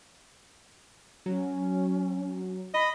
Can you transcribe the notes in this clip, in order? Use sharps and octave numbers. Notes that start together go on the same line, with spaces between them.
F#3 C#4
D#5 B5